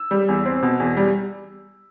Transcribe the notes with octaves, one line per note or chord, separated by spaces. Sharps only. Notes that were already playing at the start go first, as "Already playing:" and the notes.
Already playing: E6
G3
E2
C4
B2
E2
G3